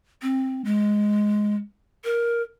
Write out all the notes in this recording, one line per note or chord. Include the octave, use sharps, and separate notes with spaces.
C4
G#3
A#4